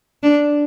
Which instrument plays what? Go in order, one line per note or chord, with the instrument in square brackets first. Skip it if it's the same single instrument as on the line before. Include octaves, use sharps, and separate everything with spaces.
[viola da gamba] D4